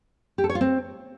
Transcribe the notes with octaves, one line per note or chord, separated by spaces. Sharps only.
G4
A4
C#5
F4
C4